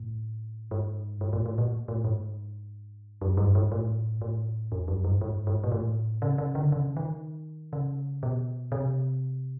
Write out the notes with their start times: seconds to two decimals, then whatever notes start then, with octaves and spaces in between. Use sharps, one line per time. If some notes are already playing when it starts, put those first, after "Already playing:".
Already playing: A2
0.71 G#2
1.21 G#2
1.33 A2
1.46 A2
1.58 A#2
1.88 A2
2.04 G#2
3.21 F#2
3.37 G2
3.55 G#2
3.72 A2
4.21 A2
4.72 F2
4.88 F#2
5.04 G2
5.21 G#2
5.47 G#2
5.64 A#2
5.72 A2
6.22 C#3
6.38 C#3
6.55 D3
6.72 C#3
6.97 D#3
7.73 C#3
8.23 B2
8.72 C3